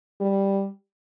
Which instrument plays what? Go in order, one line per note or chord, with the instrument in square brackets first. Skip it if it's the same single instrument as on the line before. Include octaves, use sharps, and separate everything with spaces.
[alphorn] G3